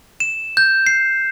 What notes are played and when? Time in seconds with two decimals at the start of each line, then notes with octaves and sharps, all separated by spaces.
0.20 E7
0.57 G6
0.87 C7